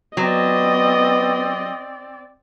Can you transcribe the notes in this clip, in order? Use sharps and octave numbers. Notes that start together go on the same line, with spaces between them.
F#3 B3 C4 D5 D#5